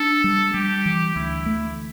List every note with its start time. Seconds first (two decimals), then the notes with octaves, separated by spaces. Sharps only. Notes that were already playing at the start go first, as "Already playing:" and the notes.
Already playing: D4 A4
0.24 G3
0.54 G3 G4
0.86 E3
1.16 D2 E4
1.46 A3